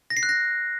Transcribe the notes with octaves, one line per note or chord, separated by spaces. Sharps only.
A#6
C7
F#6
A#6